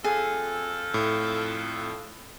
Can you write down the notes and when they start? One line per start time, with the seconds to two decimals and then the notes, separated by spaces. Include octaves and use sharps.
0.04 F2 G#4 A4
0.94 A2